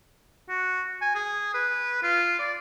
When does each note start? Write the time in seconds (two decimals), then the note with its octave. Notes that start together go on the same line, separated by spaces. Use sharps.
0.49 F#4
1.01 G#5
1.15 G#4
1.54 B4
2.03 F4
2.39 D5